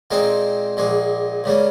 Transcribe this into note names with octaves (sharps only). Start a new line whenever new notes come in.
A#2 G#3 C4 D#4
A#1 A#2 G#3
C#2 C#3 G3 A#3